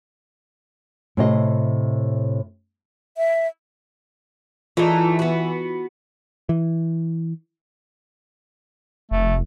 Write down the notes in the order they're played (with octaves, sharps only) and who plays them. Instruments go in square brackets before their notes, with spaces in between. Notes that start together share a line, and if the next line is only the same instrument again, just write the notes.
[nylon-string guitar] A2 C3 D#5
[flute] E5
[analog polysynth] E3 [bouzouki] A3 D#4 [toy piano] F4 G#4 D5
[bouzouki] B3 F#4
[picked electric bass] E3
[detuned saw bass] F1 [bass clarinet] A3